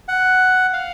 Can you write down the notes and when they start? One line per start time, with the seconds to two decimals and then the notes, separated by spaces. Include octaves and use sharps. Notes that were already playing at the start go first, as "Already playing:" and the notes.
0.08 F#5
0.73 F5